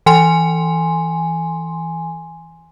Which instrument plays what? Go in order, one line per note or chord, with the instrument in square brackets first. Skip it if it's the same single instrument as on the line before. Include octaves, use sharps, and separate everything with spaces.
[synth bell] E3 G#5 C6